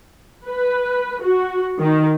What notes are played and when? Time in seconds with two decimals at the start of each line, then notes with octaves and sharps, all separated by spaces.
0.46 B4
1.22 F#4
1.81 D#3